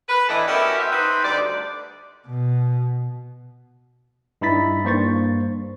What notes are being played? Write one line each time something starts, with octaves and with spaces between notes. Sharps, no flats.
B4
A2 E3 D4 A4 D5 D#5
B3 C#4 F#4 G4 A#4 E5
C4 G4 B4 E5
C4 D#4 B4
D2 G3 D#4 D5
B2
G2 D#4 E4 B5 A6 B6
G2 A#3 C5 C#6 A6